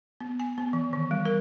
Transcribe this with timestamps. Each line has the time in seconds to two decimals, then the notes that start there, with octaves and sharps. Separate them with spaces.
0.20 B3
0.40 G#5
0.58 B3
0.73 E3
0.93 D#3
1.11 G3
1.25 A#4